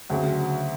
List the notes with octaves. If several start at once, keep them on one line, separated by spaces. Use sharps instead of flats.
D2 C#3 F#3